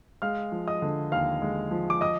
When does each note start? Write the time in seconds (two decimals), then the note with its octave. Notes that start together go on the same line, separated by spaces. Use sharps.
0.22 G#3 F5 F6
0.52 F3
0.67 D#5 D#6
0.82 D3
1.12 D#2 F5 F6
1.42 G#3
1.71 F3
1.90 D6
2.01 D#5 D#6